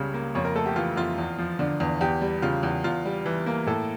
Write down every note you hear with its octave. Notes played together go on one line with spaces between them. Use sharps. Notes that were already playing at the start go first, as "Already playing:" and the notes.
Already playing: C#2 C#3 G3
A#3
F2 C#5
A#4
A3 A4
G4
E3 F4
F2 F4
E2
F3
D3
E2
E2 G4
G3
C#3 F4
E2
E2 F4
G3
E3
A#3
A2 A4